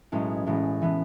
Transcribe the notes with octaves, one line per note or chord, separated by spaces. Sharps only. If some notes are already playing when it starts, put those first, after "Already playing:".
B1 A2 G#3 C#4
A1 A2 G#3
A2 E3 B3